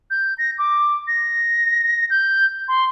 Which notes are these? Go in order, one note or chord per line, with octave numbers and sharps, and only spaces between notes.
G6
A#6
D6
A#6
G6
C6